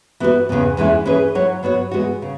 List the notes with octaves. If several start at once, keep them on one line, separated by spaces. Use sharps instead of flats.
E3 B3 F#4 B4
E2 C#3 E3 B3
E2 E3 G#3 C#4 E4
E3 C#4 G#4 B4
F#3 E4 C#5
F#3 B3 F#4 C#5
E3 G#3 B3 F#4
C#3